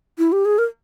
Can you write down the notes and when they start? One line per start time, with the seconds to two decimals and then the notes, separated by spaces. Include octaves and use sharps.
0.18 E4
0.32 G4
0.45 G#4
0.58 A#4